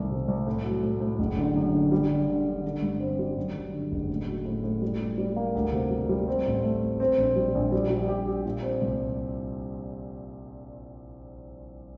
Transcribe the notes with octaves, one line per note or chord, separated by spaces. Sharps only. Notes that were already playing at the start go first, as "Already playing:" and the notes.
Already playing: C2 D#3 A3
C3
C2
A2
F#3
A2
A2
F#1
D3
F#2
D3
G3
D3
D3
D3
D3
G2
C4
G3
F#2
F#2
D3
F#1
A2
F#4
A2
A2
G3
G3
G3
A#3
D2
C3
G3
G3
C4
A1
A3
C4
C4
A#1
G3
A#1
G3
G3
G4
G4
A#2
C4
C2